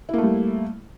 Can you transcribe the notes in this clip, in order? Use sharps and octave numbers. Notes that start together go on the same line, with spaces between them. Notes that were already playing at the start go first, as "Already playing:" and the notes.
G3 A3 A#3 E4